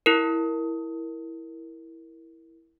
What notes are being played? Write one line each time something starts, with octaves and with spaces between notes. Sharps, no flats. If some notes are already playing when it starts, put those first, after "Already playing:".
E4 A#4